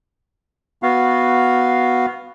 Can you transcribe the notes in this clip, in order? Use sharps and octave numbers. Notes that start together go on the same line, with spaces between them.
B3 F#4 F5